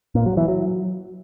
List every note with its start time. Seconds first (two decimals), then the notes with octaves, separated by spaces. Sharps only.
0.15 A#2
0.26 F#3
0.37 E3
0.48 F#3